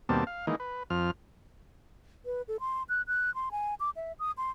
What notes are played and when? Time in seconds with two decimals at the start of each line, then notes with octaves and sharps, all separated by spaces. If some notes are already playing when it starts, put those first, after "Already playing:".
0.09 D#2 B2 G3 A#3 C4 A5
0.27 F5
0.47 D#3 E3 G#3 A#3 D#4
0.60 B4
0.90 F2 F3 F6
2.26 B4
2.48 A4
2.60 C6
2.89 F#6
3.08 F#6
3.35 C6
3.51 G#5
3.80 D6
3.96 E5
4.19 D#6
4.37 C6